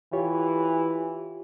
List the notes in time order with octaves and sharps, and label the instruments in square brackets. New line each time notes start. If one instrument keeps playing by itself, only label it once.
[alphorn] E3 [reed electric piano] F4 G4 C#5